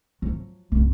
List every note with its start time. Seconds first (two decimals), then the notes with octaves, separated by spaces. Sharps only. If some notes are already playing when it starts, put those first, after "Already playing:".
0.22 F3 F#3
0.72 C2 F#2